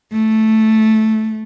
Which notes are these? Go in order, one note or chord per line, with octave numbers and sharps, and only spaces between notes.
A3